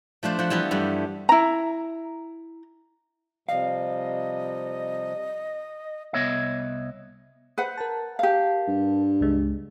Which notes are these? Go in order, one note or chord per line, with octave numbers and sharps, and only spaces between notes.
F3 A3 D4 C5
F3 F#5
E3 G3 B3 A4
G2 G3 A3
E4 A#5
C3 F3 G3 D#5 F5
C2 B3 C#5 D#5 E5
B4 C5 F#5
A#4 A5
G4 F5
G2
C#2 G#3